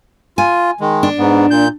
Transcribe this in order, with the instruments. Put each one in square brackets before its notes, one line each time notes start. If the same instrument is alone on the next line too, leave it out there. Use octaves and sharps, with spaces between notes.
[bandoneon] F4 [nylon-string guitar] G#5
[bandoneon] D#3 G#3
[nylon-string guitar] D4
[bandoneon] G#2 B3
A#2 G6